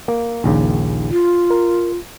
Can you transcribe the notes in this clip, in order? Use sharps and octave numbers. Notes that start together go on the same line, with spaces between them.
A#3
A#1 D#2 C#3
F4
A#4